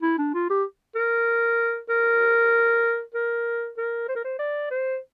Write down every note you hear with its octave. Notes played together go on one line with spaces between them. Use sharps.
E4
D4
F4
G4
A#4
A#4
A#4
A#4
C5
A#4
C5
D5
C5